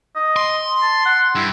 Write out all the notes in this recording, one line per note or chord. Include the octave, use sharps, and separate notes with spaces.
D#5
C6
A5
F#5
G2 E4